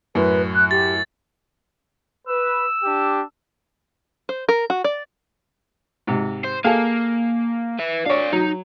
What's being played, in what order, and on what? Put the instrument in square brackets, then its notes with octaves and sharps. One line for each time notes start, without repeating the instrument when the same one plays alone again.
[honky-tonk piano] F#2 A2 [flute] B4
[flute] F#6
[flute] G4 [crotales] A6
[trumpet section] B4 [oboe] E6
[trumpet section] D4 G4
[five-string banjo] C5
A#4
F#4
D5
[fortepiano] G#2 C3
[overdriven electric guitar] C5
[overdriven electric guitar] A#3 [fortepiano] G#4 A4 F5
[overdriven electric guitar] B4 E5
[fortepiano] D4 C#5 [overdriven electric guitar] D5 F5
[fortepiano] F#3 [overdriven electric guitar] D#4